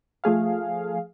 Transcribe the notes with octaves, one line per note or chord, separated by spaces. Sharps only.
F3 A3 G#4 F5